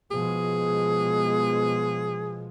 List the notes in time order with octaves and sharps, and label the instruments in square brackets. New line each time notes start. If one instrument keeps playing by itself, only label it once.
[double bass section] B2 F3 G#3 [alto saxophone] G#4